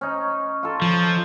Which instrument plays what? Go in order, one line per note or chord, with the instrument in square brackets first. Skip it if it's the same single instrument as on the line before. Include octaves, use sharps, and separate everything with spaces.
[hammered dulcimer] C#4 D#4
F4 A4
[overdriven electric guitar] F3